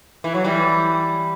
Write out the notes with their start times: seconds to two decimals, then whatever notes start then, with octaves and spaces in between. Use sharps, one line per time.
0.24 E3
0.34 F#3
0.44 E3 G3